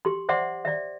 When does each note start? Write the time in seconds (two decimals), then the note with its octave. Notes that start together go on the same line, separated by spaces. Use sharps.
0.05 G4 C6
0.29 C5 D5 E5 F#5 C6 D6
0.65 D5 E5